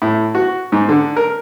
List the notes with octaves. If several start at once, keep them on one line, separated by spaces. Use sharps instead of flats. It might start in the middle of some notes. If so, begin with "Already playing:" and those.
A2
F#4
G#2
D3
A#4